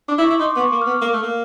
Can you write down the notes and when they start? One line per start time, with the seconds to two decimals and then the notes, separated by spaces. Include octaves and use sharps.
0.08 D4 D6
0.18 E4
0.24 C#6
0.30 E4
0.39 D#4 C6
0.50 D6
0.56 B3
0.61 C#6
0.71 A#3 D6
0.82 F6
0.87 B3
0.92 F6
1.02 A#3
1.13 A3
1.23 A#3